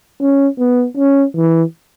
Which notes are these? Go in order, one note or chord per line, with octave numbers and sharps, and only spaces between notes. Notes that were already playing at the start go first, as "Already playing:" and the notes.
C#4
B3
C#4
E3